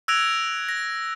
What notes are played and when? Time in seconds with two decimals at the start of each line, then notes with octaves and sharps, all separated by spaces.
0.08 E6 F#6 G#6 A#6 D7 F7
0.69 A#6